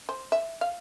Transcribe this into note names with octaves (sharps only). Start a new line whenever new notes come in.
C5
E5
F5